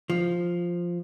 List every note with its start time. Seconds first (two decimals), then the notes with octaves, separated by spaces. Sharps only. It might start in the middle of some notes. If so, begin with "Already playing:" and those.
0.10 F3